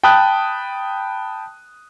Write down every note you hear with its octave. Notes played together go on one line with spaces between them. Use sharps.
G5 A5 B5 D#6 F#6